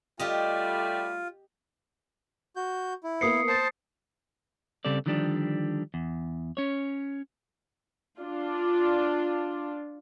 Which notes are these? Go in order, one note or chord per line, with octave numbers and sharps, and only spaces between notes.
G3 A3 F4 G4 D#5 G5
F#4 G6
E4
A#3 B3 D#6 C7 C#7
C5 A5 A6 C7
C#3 G3 C4 A4 D5
D3 D#3 F3 G3 C#4 D4
E2
C#4 C#5
D4 F4